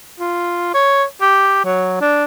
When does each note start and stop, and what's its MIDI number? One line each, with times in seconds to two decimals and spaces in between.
0.20 0.69 65
0.74 1.04 73
1.21 1.61 67
1.64 1.99 54
2.01 2.25 62